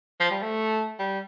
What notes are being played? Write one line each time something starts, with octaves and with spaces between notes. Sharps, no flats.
F3
G3
A3
G3